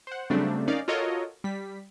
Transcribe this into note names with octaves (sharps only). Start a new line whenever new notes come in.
C5 F#5
C#3 F#3 G3 A3 C4 D4
C#4 D#4 A#4 D5 F5
F4 F#4 A4 A#4 C#5 D#5
G3 B6